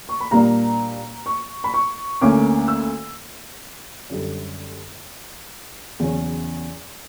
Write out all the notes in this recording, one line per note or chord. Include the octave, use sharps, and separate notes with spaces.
C#6
B5
A#2 G3 A#3 D4 A#5
C#6
B5
C#6
D2 D3 A#3 C#4 D6
E6
F#2 D3 G3
E2 C#3 F#3 C#4